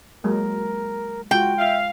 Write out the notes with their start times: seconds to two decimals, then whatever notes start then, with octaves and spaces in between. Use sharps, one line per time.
0.24 F#3 G#3 A#3 A#4
1.31 G#3 F4 F#4 G5
1.58 E5 F5